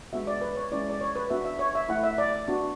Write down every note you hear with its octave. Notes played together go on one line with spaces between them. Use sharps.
G#3 B3 D4 F#4 E5
D5
B4
C#5
G#3 C#4 E4 D5
D5
C#5
B4
B3 D4 F#4 E5
E5
C#5
E5
A3 E4 F#5
E5
D5
B3 D4 F#4